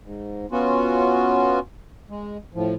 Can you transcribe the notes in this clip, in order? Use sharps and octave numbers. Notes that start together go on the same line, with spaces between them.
G#2
B3 C#4 F4 F#4
G#3
A2 F3